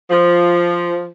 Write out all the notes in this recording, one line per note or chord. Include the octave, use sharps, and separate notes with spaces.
F3